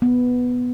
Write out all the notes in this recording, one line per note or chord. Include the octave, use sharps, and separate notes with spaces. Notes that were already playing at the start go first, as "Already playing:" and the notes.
B3